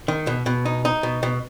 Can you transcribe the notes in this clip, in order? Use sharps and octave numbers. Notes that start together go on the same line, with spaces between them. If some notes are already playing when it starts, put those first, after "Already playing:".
D#3
B2
B2
D#4
D#4
B2
B2